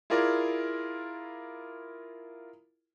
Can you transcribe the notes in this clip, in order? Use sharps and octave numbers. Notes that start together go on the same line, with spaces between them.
E4 F4 G#4 A#4 D5